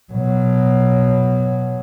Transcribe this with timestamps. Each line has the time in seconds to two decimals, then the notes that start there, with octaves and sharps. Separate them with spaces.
0.13 B2 F#3